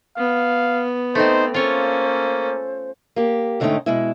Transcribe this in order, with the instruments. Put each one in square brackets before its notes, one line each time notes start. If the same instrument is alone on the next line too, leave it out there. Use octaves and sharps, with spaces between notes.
[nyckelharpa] B3 [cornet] F5
[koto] A3 C4 [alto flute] D#4 [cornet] C5
[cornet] A#3 [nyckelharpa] C#4 A4 [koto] F4 C#5 [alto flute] C5
[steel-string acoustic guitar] A#3 G4
G#2 D3 A3 C#4 D#4 G5
B2 G#3 E4